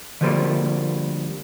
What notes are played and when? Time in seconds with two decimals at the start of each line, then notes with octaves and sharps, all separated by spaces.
0.21 D3 F3 G3 A#3